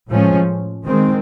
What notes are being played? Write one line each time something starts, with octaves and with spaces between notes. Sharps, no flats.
A2 F3 G#3 C#4
D#3 G#3 C4